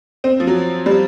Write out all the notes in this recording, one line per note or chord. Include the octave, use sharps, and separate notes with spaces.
C4
F3
F#3
G3